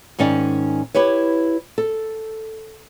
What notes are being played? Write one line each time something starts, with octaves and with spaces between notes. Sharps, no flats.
G#2 D#3 C#4 D#4 D5
E4 G4 B4 C#5
A4